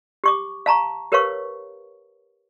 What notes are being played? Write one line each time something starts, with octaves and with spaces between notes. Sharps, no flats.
G4 C#6 D6
F5 A5 A#5 C#6
G4 A#4 B4 C#5 F5 C#6